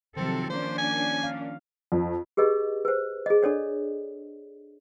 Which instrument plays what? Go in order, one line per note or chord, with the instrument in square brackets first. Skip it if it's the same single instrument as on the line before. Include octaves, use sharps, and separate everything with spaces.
[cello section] C3 F#3 A4 [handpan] D#3 F3 [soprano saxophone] C4
[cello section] A#3 C#4 D4 [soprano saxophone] C5
[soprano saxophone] G#5
[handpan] F5
[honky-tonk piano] F2
[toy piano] G4 G#4 B4 D#5
B4 C5
G#4 D#5
D4 A4 C#5 D5